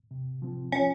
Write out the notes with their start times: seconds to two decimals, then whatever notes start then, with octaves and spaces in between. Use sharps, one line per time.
0.11 C3
0.42 F3 C4
0.72 F3 C#4